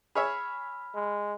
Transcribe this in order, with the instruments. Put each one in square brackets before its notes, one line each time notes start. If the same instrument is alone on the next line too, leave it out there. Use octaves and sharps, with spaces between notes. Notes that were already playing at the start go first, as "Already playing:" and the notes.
[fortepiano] G#4 C#5 E5 [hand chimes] B5 F6
[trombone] G#3